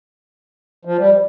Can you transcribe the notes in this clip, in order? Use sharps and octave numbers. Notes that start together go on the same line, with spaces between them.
F3
G3